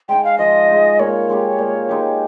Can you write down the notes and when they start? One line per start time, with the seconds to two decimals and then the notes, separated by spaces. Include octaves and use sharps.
0.09 G#3 D#4 G5
0.24 F5
0.38 F3 D#5
0.69 G#3 D#4
0.99 A#2 C#5
1.29 G#3 D#4 G4
1.59 A#2
1.89 G#3 D#4 G4